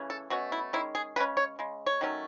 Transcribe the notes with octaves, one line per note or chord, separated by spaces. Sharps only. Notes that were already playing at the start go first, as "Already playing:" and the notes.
Already playing: C#3 E3 A3 C#4
A4
B2 A3 C#4 F#4
E4
D#3 G#3 C#4 E4
G#4
C#3 G#3 C#4 B4
C#5
C#3 G#3
C#5
D#3 F#3 A3 C#4